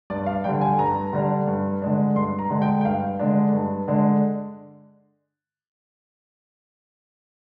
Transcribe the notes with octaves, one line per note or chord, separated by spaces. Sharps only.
G2 D5
F5
D3 G3 D4 G5
G#5
G2 A#5
D3 G3 D4
G2
D3 G#3 D4
G2 C6
A#5
D3 G#3 D4
G5
G5
G2 F5
D3 G#3 D4
G2
D3 G#3 D4